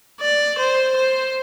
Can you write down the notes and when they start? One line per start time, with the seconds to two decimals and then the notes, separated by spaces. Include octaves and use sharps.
0.20 D5
0.58 C5
0.96 C5